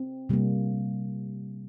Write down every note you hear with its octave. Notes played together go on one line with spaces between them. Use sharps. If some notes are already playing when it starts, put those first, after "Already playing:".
Already playing: C4
C3 G3 A#3